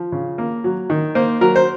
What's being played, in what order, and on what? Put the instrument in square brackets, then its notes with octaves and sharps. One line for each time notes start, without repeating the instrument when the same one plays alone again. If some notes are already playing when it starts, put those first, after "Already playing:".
Already playing: [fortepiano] F3
C#3
A#3
F#3
D#3
A#3 C5
F#3 A#4
C5